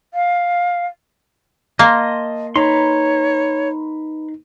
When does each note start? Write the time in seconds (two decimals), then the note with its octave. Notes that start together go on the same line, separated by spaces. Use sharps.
0.14 F5
1.79 A#3 D#5 A5 C6
2.56 D#4 B4 C#5 A#5 C6